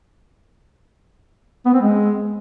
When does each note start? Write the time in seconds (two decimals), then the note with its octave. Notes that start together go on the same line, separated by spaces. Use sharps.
1.65 B3
1.73 C4
1.81 G#3